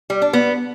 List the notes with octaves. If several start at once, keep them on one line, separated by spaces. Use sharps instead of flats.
G3
D4
B3